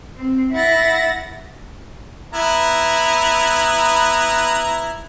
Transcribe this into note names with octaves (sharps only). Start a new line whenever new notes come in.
C4
E4 F#5 A6 A#6
B3 E4 A#5